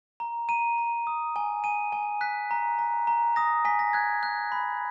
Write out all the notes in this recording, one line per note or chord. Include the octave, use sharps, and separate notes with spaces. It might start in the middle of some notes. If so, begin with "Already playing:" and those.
A#5
A#5 D#7
A#5
D#6
G#5
G#5 D#7
G#5
F#6 B6
A#5
A#5
A#5
D#6 A#6
G#5 B6
A#6
F#6 G#6
F#6
B5